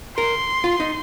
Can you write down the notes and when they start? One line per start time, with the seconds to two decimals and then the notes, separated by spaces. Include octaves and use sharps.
0.17 A#4 C6
0.64 F4
0.80 D#4